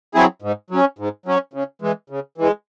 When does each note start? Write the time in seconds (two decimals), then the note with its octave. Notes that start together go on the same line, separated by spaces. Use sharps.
0.15 F#3 C4 E4 G#4
0.42 G#2
0.70 F#3 C#4
0.99 G#2
1.26 F#3 C#4
1.54 C#3
1.82 E3 G#3
2.10 C#3
2.38 E3 G#3